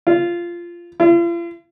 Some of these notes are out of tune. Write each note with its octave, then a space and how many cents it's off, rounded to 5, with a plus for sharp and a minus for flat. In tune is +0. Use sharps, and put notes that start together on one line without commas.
F4 -15
F4 -45